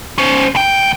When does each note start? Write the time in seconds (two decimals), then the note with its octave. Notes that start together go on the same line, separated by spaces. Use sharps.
0.18 C#4 C5
0.55 D2 G5